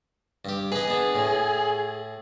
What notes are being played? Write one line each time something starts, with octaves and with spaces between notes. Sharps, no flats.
G2 G4
G#4 B4 D#5
B3 D4
A2